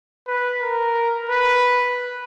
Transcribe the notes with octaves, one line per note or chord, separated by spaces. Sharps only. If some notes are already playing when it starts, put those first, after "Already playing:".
B4
A#4
B4